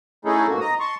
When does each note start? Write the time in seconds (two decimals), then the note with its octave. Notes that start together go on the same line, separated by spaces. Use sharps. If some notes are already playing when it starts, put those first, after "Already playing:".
0.25 A3 C#4 D#4 E4 G#4 A4
0.49 G#2 B2 A#3 F#4
0.60 D#5 A#5 D#6
0.80 A5 C6 C#6